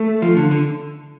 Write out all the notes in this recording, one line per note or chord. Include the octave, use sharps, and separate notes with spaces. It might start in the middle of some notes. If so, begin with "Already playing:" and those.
Already playing: A3
F3
D3
D3